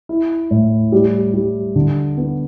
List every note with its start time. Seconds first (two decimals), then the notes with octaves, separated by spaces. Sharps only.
0.09 E4
0.51 A2
0.92 G3
1.34 G3
1.76 D3
2.17 B3